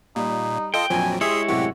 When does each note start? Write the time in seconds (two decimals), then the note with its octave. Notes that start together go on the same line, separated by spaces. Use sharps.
0.16 A#2 G3 D#4
0.74 F4 A4 D#5 G5
0.90 A#1 F2 F3 F#3 G#5
1.21 G#3 E4 G4 G#4 C#5 E5 C6
1.49 F#2 A2 C3 F#4 G4